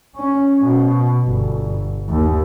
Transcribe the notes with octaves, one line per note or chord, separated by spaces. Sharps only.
C#4
B2
G1
D#2